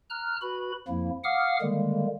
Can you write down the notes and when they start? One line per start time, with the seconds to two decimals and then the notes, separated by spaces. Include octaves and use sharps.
0.10 A#5 F6 F#6
0.42 F#4 B4 B5
0.88 F2 F3 A#3 E4
1.24 F5 F#5 D6 D#6 F6
1.61 D3 D#3 G3 G#3 A#3